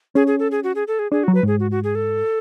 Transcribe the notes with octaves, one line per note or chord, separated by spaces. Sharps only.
C#4 G#4
G#4
A4
G#4
F#4
G#4
A4
G#4
D4 G#4
F#4
F#3
B4
G#2 G#4
F#4
F#4
G#4
A4